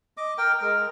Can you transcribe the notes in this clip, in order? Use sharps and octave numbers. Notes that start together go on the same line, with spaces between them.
D#5 D6
A#4 G5
G#3 A#4